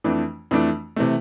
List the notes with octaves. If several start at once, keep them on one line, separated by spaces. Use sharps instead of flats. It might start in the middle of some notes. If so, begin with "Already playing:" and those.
F2 E3 A3 D4
F2 E3 A3 D4
C3 E3 A3